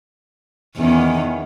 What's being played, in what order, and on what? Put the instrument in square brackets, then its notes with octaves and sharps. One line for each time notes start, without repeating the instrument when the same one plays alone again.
[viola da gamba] E2 D#3 C#4